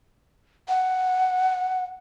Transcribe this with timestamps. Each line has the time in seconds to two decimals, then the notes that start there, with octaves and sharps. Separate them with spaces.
0.68 F#5